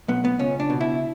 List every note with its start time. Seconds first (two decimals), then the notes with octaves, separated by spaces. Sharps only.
0.08 B1 B3
0.25 B3
0.39 C#2 C#4
0.60 D4
0.70 B2
0.81 E4